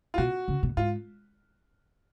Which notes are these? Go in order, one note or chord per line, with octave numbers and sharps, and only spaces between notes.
F4
B2 F#4
C#3
B2
G#2 F4